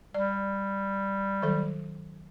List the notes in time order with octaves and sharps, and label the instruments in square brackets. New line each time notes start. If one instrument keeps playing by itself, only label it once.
[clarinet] G3 [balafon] D5
[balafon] D#3 F#3 A4